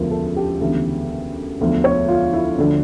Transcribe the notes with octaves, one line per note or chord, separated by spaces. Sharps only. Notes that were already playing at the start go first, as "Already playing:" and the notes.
Already playing: E1 D2 C#3 F3 A#4
A4
G4
E1 D2 C#3 E3
E1 D2 D3 F3
C#5
F4
E4
D2 D3 F3 D4